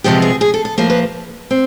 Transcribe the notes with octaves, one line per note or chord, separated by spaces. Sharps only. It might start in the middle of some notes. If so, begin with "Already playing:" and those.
E2 C3 F3 G#3 B3 G4
G#4
G#4
A4
A4
A2 F3 A#3 A#4
B4
C4